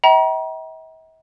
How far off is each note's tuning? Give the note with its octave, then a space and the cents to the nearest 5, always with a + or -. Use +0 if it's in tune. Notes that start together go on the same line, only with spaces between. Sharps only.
E5 -45 G5 -40 A#5 +35